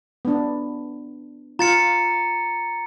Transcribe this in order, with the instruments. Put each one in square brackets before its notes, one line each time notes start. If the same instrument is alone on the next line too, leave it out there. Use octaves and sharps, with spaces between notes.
[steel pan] B3 D4
[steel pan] F4 [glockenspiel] A#5 A6 C#7